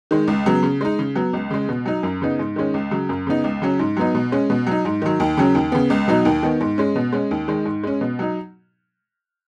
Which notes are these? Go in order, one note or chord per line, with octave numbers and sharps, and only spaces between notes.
D#3 G#3
C#2
C#3 F#3 B3
C#3
G#3 D#4
C#3
F#3 B3
C#2
C#3 G#3
B2
F#3 D#4
F#2
C#3 B3 D#4
G#2
D#3 G#3 C#4
C#2
C#3 F#3
F#2
C#3 B3 D#4
C#2
C#3 F#3 C#4
G#2
F#3 B3 D#4
B2
G#3 C#4
B2
F#3 D#4
G#2
D#3 F#3
D#2
C#3 F#3 C#4
D#2
C#3 B3
C#2
B2 F#3 D#4
D#2
D#3 B3
G#2
G#3 C#4
B2
G#3 C#4
D#2
D#3 G#3
G#2
G#3 C#4
B2
F#3 D#4